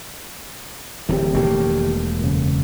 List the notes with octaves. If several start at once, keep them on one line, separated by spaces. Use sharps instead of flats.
D1 E3 C4 G4
E1 D#3 A3 A#3 G4
F#2 A2 C#3